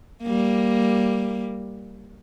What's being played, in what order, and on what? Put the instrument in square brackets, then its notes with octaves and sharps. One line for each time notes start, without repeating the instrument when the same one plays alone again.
[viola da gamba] G3 A#3